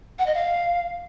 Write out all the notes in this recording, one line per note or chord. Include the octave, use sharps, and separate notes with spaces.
F#5
D#5
F5